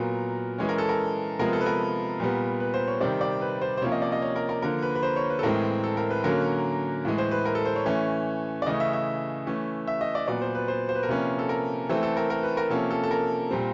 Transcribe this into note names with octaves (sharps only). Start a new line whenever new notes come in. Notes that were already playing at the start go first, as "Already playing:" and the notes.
Already playing: A#2 F#3 B3 A#4
E3 G#3 C#4
A#4
A4
A#4
C3 F3 G#3 B3 A#4
A4
B4
A#4
A#2 G3 B3
B4
C5
C#5
C3 D#3 G3 C4 D5
D5
B4
C5
C5
C3 F3 A#3 C#4 C#5
D#5
D5
D#5
C#5
A#4
A#4
D3 F3 A#3 A#4
B4
B4
C5
C#5
B4
A4
A2 E3 G#3 C4 A#4
A4
A#4
B4
D3 F#3 A#3 C#4 A#4
A2 E3 G#3
C5
B4
A#4
A4
C5
C#5
E3 A3 C#4
D5
C#3 E3 A3 C#4 D#5
E5
E5
E3 A3 C#4
E5
D#5
D5
A#2 F#3 B3 D5
C5
B4
C5
C5
B4
A#4
C3 F3 A#3 C#4 B4
A4
A#4
E3 A3 C4 A4
A4
A#4
A#4
B4
A#4
C3 F3 A#3 C#4 A4
A4
A4
A#4
A#2 G3 C4